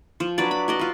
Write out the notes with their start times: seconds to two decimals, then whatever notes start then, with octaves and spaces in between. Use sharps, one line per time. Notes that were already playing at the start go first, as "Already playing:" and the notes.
0.20 F3
0.38 F#3 D4 B4 D5
0.51 B5
0.68 F#4 D5 D#5
0.79 F4 B4